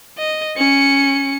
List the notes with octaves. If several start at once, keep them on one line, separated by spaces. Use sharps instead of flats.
D#5
C#4 C#7